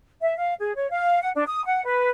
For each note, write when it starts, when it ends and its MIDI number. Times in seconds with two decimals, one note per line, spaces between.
0.21 0.34 76
0.37 0.54 77
0.60 0.73 68
0.76 0.89 73
0.91 1.21 77
1.22 1.30 78
1.35 1.45 62
1.47 1.63 87
1.65 1.83 78
1.85 2.10 71